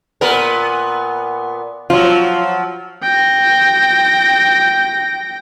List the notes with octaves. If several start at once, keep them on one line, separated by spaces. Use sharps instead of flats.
A#2 B3 A#4
F3 F#3 F4
G5 A#6